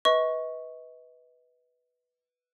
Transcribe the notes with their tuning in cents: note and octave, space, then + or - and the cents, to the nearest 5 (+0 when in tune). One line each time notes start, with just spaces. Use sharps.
B4 -5 D#5 +35 C#6 +0